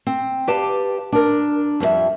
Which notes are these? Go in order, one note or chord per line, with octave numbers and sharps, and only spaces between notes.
C4
G4 B4 D5 F5 A5
D4 A#4
F2 G3 A4 E5